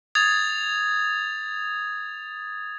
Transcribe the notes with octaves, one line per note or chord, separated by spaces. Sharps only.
D#6 G#6 A6 F7